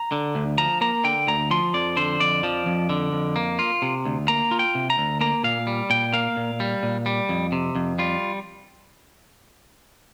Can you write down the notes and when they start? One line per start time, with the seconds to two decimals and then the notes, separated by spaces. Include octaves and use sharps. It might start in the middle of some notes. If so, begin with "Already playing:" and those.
Already playing: A#5
0.12 D3
0.35 D2
0.58 F3 A#5
0.81 A#3 A#5
1.04 D3 G5
1.28 D2 A#5
1.51 F3 C6
1.74 F2 D5
1.97 D3 C5
2.20 F2 D5
2.43 F3
2.66 F2
2.89 D3
3.13 F2
3.36 A#3
3.59 F4
3.82 C3
4.05 D2
4.28 A#3 A#5
4.51 F4
4.59 G5
4.75 C3
4.90 A#5
4.98 D2
5.21 A#3 A#5
5.44 A#2 F5
5.67 G3
5.90 A#2 G5
6.13 A#3 F5
6.37 A#2
6.60 G3
6.83 A#2
7.06 G3
7.29 F2
7.52 C3
7.75 F2
7.99 G3 F4